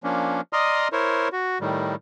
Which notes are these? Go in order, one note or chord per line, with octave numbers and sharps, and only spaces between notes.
F3 A#3 C#4 D4
D5 D#5 A#5 C6 D#6 F6
E4 A#4 C5 C#5
F#4
A2 D#3 G3